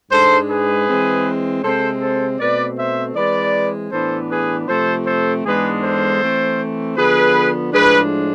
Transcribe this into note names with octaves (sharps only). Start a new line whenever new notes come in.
G#2 G#3 D4 A4 C5
G#4 B4
E3 G#3 C4
C3 G#3 C4 A4 C5
A4 C5
B2 A3 C4 B4 D5
C5 E5
E3 G#3 C4 B4 D5
A2 E3 B3 D4 A4 C5
G#4 B4
C3 F3 A3 C4 A4 C5
A4 C5
G#2 E3 G#3 B3 D4 G#4 B4
A4 C5
E3 A3 C4
D3 F3 B3 G#4 B4
A2 F3 G#3 D4 G#4 B4